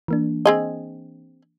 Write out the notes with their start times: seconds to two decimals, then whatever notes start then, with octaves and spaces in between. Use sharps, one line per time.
0.08 E3 A#3 D4
0.46 C4 G#4 D#5